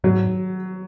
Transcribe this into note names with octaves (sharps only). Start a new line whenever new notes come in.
G#2 F#3